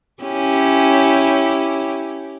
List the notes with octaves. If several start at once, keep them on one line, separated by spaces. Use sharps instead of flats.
C#4 E4 G4